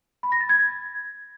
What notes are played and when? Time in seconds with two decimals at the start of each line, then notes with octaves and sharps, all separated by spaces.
0.23 B5
0.32 A#6
0.41 A6
0.49 G#6